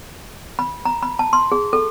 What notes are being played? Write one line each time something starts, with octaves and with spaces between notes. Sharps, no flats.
B5
A#5
B5
A5
C6
G#4
A4